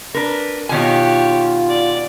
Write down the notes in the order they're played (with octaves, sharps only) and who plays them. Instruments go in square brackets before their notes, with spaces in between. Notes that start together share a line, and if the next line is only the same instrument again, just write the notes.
[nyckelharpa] D4 [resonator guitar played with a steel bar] A#4 B4
[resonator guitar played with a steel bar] B2 D#3 G#5 [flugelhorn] F4 [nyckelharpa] G4 C#5
[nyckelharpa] D5